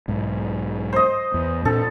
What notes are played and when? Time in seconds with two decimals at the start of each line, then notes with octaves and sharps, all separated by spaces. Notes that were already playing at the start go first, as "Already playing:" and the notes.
0.08 B1 G#2
0.93 C5 D#5
1.34 E2
1.65 A#2 C4 D4 A4